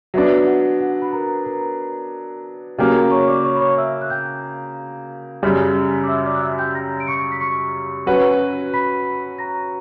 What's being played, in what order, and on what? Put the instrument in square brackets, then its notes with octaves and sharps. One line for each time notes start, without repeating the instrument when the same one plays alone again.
[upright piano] F#3 B3 D4 [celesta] E5
[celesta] F#5
F#5
B5
A#4 A#5
A#4 A#5
[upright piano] C#3 F#3 A#3 [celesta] G4 G5
[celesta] A#4 A#5
C#5 C#6
C#6
D5 D6
C#5 C#6
B5
C#5 C#6
E5 E6
F#6
G5 G6
[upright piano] F#2 C#3 G3
[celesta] D6
E5 E6
D5 D6
F#6
E5 E6
G5 G6
A#5 A#6
D7
C#6 C#7
B6
C#6 C#7
[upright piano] F#3 C#4 F#4 B4
[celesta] B5 B6
A#5 A#6